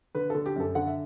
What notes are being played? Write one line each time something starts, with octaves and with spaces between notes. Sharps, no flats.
D3 B4
D3 A4
G4
F#2 A4
D3 F#5
E5